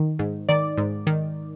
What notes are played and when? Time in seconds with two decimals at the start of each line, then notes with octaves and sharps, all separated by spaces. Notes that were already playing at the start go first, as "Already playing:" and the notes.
Already playing: D#3
0.19 G#2
0.49 D#3 D5
0.78 G#2
1.07 D#3